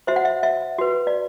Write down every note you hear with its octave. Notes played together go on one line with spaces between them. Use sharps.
F#4 C5 E5
F#5
E5
E5
F#4 B4
D5